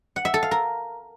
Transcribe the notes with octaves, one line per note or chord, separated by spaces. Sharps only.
F#5
E5
A4
F5
A#4